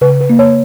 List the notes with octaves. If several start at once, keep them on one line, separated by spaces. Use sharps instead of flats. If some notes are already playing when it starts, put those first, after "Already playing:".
C#3 B4
B4
A#3
C#5